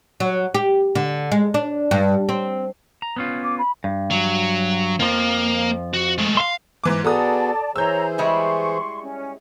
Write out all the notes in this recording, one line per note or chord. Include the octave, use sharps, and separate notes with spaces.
F#3
G4
D3
G#3
D4
G2
C4
A#5
B3 C#4 F4
D6
B5
G2
F#3
F2 F3 A#3
F#4
G#3 A3
E5 F5 C6
G#2 E3 D6
B3 F#4 G#4 A4 D5 A5 A#5 D#6
E3 G#4 C5 C#5 A#5 E6 G6
G3 G#3 E4 C6 C#6
C#4